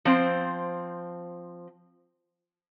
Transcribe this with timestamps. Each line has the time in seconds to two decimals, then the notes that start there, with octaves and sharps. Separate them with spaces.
0.05 F3 C4 C5